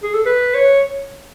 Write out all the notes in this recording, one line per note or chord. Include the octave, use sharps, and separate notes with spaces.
G#4
A4
B4
C#5